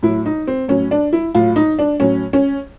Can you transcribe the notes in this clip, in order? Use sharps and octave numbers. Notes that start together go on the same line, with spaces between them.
A2 F#3 E4
D#4
C4
A2 F#3 C#4
D4
E4
A2 F#3 F4
D#4
D4
A2 F#3 C#4
C#4